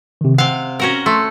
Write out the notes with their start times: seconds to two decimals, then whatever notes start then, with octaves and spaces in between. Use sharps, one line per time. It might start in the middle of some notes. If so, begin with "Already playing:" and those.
0.21 C3 D#3
0.38 C3 F5 F#5
0.80 C#4 F#4 A#4
1.06 A3 C6